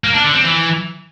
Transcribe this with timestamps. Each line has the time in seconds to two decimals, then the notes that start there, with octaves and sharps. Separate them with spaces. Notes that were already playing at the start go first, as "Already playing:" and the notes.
0.04 A#3
0.14 D4
0.24 D3
0.34 C4
0.44 E3